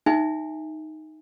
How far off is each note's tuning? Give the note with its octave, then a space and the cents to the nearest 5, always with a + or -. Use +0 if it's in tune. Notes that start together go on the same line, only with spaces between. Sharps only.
D#4 +0 E5 +0 G#5 -20